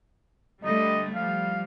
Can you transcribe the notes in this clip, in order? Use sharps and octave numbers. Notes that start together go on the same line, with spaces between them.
D3 G3 A3 D#5
F3 G3 F5